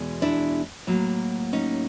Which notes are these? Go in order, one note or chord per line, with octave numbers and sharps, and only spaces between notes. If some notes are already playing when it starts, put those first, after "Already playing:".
Already playing: E2 B2 G#3
D4 E4
A2 F#3 A#3
C#4 D#4